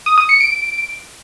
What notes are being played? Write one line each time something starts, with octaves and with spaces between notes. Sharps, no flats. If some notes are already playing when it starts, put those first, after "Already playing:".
D#6
D#6
C#7
D7